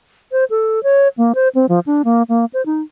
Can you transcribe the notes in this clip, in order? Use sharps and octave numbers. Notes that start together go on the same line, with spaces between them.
C5
A4
C#5
A#3
C5
C4
F3
D4
A#3
A#3
C5
D#4